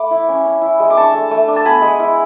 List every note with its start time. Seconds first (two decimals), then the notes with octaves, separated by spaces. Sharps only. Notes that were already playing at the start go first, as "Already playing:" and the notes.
Already playing: A3 B5 D6
0.11 E4
0.29 C#4
0.45 C#4
0.62 E4
0.80 G#3
0.90 D6
0.97 D4 A5 C#6
1.14 A3
1.31 A3
1.48 D4
1.56 A5
1.65 B3 G#5 B5
1.82 G#3
2.00 E4